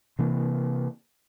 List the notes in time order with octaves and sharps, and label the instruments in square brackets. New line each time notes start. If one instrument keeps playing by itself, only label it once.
[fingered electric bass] C3 E3 A#3